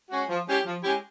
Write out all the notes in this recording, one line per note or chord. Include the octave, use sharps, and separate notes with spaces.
G#3 C#4 F#4
F3
G#3 C#4 E4 G4
F3
G#3 C#4 E4 G4